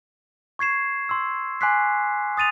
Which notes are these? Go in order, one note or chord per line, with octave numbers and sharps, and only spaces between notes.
C#6 G#6 C7 E7
C6 E6
G#5 C6 D6 F#6 B6 C7
D#6 A6 D#7 F7